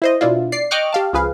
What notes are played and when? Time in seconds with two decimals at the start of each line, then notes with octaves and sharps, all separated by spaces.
0.02 E4 C5 D#5
0.21 B2 D4 E4 F4
0.52 D5 C7
0.71 D#5 G5 C#6 D6 F6 F#6
0.93 G4 F5 A5
1.13 C#2 F3 G#4 B4 F5